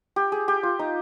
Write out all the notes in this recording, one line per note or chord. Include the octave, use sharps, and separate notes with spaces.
G4
G#4
G4
F4
D#4